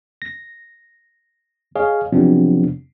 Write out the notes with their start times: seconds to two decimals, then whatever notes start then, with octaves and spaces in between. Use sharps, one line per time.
0.22 A#6
1.76 G#4 C#5 D#5 F5
2.13 C3 F3 F#3 B3 C4 D4